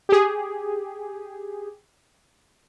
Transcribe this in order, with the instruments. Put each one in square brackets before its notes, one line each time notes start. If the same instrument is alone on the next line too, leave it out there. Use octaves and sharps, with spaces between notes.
[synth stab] G4 G#4